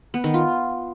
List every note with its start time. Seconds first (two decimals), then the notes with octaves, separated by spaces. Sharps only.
0.14 B3
0.24 D#3
0.34 F4